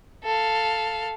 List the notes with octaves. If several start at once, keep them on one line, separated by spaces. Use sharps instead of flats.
A4 F5